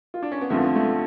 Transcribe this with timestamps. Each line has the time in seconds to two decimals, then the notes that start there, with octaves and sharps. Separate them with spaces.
0.14 F4
0.22 D4
0.32 C#4
0.41 B3
0.50 F2 D3 F3 A3
0.76 A3